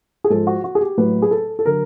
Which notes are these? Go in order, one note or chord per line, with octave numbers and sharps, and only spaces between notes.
G#4
G#2 F3 A4
F#4
F#4
G#4
G4
A2 F#3 B4
G#4
A4
A4
D3 F#3 A#4